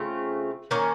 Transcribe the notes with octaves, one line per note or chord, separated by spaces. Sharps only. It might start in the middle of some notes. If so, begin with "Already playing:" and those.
Already playing: C#3 A3 C4 F4
D#3 A#3 C#4